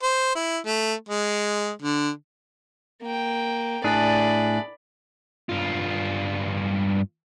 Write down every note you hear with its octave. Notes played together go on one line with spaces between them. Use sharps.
C5
E4
A3
G#3
D3
A#3 G5
A2 D4 G#4 D5 B5
G2 F4